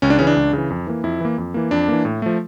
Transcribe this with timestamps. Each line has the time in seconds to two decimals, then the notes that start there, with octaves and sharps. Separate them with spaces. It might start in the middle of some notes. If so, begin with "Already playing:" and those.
0.02 C#2 C#4
0.10 D4
0.19 C#3 E3 C#4
0.27 D4
0.36 C#2
0.53 C#3 E3
0.70 F2
0.87 E3 A#3
1.04 F2 E4
1.20 E3 A#3
1.38 F2
1.54 E3 A#3
1.71 F2 D4
1.88 E3 A#3
2.05 A2
2.22 F3 A3